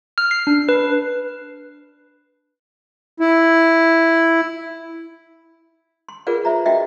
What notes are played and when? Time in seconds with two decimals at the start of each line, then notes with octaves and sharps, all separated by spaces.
0.18 F6
0.31 C7
0.47 D4
0.69 B4
3.20 E4
6.09 C6
6.27 F4 G#4 A#4 B4 D5 F#5
6.45 C5 E5 A#5
6.66 D4 F#4 D#5 E5 G5